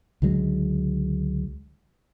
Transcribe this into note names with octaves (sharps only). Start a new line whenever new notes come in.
C#2 D3 F#3 G#3